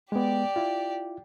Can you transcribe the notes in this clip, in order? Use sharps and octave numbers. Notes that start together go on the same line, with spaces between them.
G#3 B3 G4 D5
E4 F4